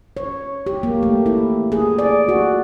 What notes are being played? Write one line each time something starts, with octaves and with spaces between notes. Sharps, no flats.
C#5
G4
A#3
A3
E4
G#4
D5
F#4